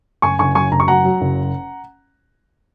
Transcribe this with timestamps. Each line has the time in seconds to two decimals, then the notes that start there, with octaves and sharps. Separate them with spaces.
0.22 F#1 G#5 C#6
0.39 F#1 G#5 C#6
0.55 F#2 G#5 C#6
0.72 F#1 A#5
0.80 C#6
0.88 F#3 F#5 A#5
1.05 F#3
1.21 F#1